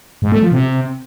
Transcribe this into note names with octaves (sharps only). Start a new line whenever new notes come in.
G#2
A3
F3
C3